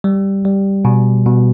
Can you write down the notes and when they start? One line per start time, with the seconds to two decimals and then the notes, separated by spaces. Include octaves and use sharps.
0.04 G3
0.45 G3
0.85 B2
1.26 B2